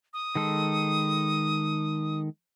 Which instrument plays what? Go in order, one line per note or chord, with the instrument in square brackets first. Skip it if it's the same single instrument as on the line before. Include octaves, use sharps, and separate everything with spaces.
[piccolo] D#6
[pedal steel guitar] D#3 G#3 A4